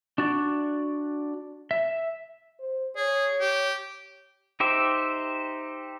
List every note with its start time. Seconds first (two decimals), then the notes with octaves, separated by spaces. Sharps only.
0.18 D4 F#4 D5
1.71 E5
2.59 C5
2.96 G#4 C#5
3.40 G4
4.60 D#4 G4 C5 E5